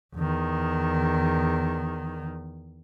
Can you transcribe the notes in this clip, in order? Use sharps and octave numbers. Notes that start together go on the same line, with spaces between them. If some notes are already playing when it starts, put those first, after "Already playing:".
E2 D#3